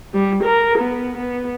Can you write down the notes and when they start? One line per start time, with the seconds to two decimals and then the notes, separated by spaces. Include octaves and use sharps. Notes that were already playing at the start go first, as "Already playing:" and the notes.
0.13 G3
0.43 A#4
0.78 B3
1.17 B3